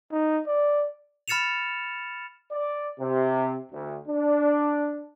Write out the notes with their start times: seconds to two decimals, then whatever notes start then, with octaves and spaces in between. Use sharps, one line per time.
0.12 D#4
0.46 D5
1.28 B5 F6 A6 C#7 E7 F7
2.52 D5
2.99 C3
3.72 D2
4.08 D4